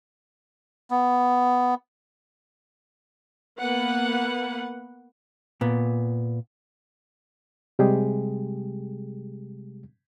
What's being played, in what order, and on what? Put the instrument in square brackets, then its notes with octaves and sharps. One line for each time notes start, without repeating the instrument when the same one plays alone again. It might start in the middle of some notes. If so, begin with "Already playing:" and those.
[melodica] B3
[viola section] A#3 B3 B4 F#5
[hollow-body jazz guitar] A#2 B3
[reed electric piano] C3 G3 G#3 G4 G#4